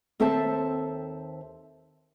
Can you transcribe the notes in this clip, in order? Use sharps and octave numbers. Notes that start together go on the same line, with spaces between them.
D#2 C4 A4 C5 E5 A5